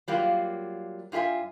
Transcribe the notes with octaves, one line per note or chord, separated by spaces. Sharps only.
F#3 G3 A#3 F4
G2 F4 G#4 E5 G#5